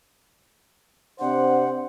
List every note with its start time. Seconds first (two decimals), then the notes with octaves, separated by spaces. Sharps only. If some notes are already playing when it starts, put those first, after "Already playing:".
1.20 C3 D4 C5 F#5